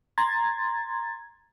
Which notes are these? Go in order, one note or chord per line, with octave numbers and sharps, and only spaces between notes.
A#5 C6 G#6 A6